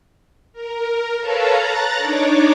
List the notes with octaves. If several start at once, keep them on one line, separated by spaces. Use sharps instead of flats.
A#4
A4 B4 C#5 F5 A5 A#5
A#5 F#6 A6
D4 D#4 C#5 D6